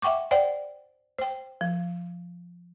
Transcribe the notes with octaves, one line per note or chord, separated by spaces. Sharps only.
E5 F#5 G5 C#6 D6
C5 D5 F#5 G5
C5 G5
F3